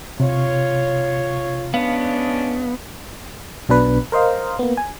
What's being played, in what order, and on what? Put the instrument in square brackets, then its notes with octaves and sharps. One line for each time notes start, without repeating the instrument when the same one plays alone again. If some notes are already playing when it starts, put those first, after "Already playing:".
[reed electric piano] C3 [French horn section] F4 C#5
[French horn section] G#3 C#4 D4 [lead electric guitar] B3 [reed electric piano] F5
[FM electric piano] B1 B2 D4 B4
A#4 C5 D#5 F5
A#3 B3
G#5